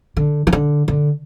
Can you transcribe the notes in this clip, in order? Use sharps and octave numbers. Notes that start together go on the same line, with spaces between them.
D3
D#3
D3
D3